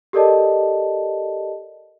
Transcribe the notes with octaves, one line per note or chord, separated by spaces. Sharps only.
G4 A4 A#4 D5 D#5 A5